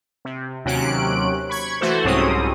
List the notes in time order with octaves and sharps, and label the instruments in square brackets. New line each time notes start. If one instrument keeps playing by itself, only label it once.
[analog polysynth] C3
D#2 C3 F#3 C#4 F#6 D7
B5 C#6 G#6
E3 A3 F#4 A4 C5
C2 G#2 F#3 C4 C#4 D#6